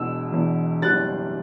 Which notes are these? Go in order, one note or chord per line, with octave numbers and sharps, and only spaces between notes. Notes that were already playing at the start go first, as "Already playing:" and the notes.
Already playing: E1 E2 B2 E6
E1 E2 B2
F#1 E2 B2 G3 F#6 A6